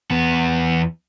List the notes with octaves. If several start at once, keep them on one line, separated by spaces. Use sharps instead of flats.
E2 B3